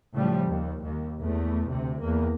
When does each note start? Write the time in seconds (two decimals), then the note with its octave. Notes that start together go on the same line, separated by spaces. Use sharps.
0.15 A2 C#3 F3 G3
0.47 D#2
0.82 D#2
1.23 E2 A3
1.68 D2 C3
2.02 E2 A#3